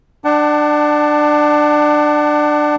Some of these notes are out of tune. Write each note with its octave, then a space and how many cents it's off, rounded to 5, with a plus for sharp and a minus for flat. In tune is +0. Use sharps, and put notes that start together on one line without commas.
D4 +20 F#5 +35 A5 +0